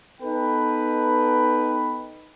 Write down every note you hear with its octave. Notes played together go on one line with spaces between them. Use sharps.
B3 D#4 A4 B4 G5